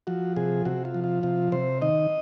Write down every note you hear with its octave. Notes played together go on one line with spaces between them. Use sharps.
F3 F#4
C3 G#4
C3 F#4
F4
F3
F4
C3 F4
C3 C5
D#3 D#5